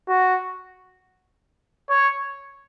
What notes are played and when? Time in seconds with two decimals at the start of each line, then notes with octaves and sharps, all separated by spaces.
0.08 F#4
1.90 C#5